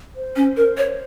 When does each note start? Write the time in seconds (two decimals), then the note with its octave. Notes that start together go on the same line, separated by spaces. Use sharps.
0.16 C5
0.36 C#4
0.57 A#4
0.77 C#5